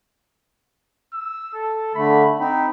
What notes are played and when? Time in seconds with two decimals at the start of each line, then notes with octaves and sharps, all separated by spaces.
1.13 E6
1.54 A4
1.95 D3 A3 B5
2.39 C4 D#4 B5